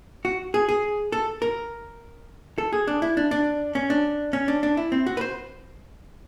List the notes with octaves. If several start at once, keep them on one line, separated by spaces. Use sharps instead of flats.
F#4
G#4
G#4
A4
A#4
A4
G#4
D4
E4
D4
D4
C#4
D4
C#4
D4
D4
E4
C4
F#4
B4
C5